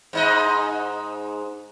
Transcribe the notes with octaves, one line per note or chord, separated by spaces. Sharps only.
G#2 D#4 D#5